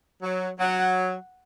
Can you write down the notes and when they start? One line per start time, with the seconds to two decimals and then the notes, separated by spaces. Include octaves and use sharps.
0.23 F#3
0.60 F#3 F#5